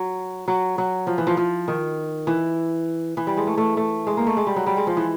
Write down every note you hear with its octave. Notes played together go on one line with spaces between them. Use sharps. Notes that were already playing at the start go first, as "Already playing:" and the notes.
Already playing: F#3
F#3
F#3
F3
E3
F3
F3
D#3
E3
E3
G3
G#3
A3
A3
A3
G#3
A#3
A3
G#3
G3
F#3
G3
G#3
F3
E3